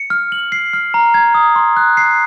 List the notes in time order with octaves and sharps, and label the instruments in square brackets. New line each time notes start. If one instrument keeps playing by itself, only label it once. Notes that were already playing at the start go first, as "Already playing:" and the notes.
Already playing: [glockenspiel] C#7
F6
F#7
C7
F6
A#5
G#6
D#6
C6
F#6
C7